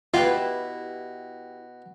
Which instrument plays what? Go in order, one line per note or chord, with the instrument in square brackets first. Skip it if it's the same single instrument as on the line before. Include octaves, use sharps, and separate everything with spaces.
[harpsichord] B2 [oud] E4 G4 B4 [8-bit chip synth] F4